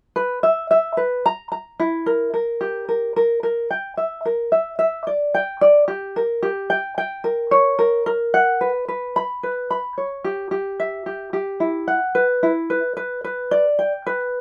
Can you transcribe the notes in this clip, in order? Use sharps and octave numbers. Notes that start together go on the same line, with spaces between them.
B4
E5
E5
B4
A#5
A#5
E4
A#4
A#4
G4
A#4
A#4
A#4
G5
E5
A#4
E5
E5
D5
G5
D5
G4
A#4
G4
G5
G5
A#4
C#5
A#4
A#4
F#5
B4
B4
B5
B4
B5
C#5
G4
G4
E5
G4
G4
E4
F#5
B4
E4
B4
B4
B4
D5
G5
B4